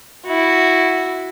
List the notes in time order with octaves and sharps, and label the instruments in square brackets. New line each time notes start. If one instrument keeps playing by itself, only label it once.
[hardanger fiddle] E4 F#4